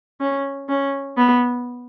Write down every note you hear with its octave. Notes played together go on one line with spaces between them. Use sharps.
C#4
C#4
B3